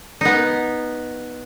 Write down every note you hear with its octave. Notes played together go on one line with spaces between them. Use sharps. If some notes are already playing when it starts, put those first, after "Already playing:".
B3 D#4